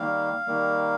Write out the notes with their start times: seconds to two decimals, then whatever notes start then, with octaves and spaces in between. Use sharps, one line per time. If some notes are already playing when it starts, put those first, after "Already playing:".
Already playing: D#3 G3 A#3 F5
0.47 D#3 G3 A#3